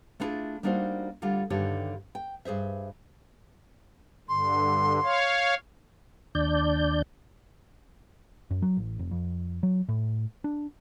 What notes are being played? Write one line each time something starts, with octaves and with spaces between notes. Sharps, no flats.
A3 B3 D4 E4 F4 G#4
G3 A#3 D4 D#4 F#4 C5
D2 D3 G3 F4
G2 D3 D#3 G4 A4 C#5
G5
G2 G#4 C5 E5
G2 D3 C6
C#5 F5
D#2 D4 D5 G6
F#2
F#3
A1
F1
F2
F#3
A2
D4